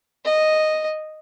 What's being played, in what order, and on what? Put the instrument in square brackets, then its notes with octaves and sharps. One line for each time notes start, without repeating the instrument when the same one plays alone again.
[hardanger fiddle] D#5